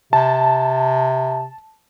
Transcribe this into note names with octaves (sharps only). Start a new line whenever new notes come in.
C3 A5